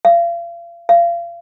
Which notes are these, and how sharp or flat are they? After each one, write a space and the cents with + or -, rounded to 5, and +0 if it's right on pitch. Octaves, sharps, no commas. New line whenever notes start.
F5 -35
F5 -30